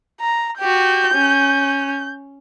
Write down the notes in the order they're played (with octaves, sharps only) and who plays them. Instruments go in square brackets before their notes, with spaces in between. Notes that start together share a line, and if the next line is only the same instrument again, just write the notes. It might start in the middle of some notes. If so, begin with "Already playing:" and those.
[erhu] A#5
[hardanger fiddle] F#4 G4 [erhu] G6
[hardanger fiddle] C#4